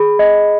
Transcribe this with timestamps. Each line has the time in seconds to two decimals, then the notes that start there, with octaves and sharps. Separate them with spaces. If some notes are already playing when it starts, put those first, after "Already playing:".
Already playing: G#4 B5
0.19 D#5